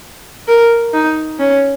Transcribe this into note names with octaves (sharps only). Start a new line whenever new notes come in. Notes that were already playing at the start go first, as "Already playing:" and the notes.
A#4
D#4
C#4